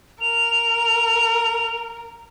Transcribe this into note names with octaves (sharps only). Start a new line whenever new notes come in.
A#4 F7